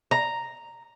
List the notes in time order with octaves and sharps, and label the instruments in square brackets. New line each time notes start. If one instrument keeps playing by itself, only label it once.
[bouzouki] A#5